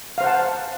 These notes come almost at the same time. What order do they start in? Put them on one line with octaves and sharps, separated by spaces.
F5 C5 F#5 A5